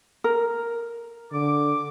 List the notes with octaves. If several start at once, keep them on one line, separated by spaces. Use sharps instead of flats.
A#4
D3 D6